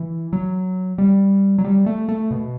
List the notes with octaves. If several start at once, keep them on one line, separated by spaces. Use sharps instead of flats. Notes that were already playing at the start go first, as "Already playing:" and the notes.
Already playing: E3
F#3
G3
F#3
G3
A3
A3
B2